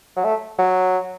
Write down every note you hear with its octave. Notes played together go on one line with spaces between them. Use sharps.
F#3
A3
F#3